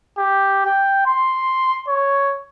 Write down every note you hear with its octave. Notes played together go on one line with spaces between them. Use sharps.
G4
G5
C6
C#5